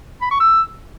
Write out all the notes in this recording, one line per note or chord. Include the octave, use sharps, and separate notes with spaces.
B5
C#6
E6